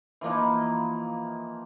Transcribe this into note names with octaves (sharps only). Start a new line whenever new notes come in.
E3 F3 A#3 D#4